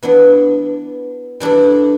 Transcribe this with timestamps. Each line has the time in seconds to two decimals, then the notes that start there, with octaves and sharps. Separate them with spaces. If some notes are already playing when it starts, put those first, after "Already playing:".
0.03 E3 B3 D4
1.40 E3 G3 D4 A4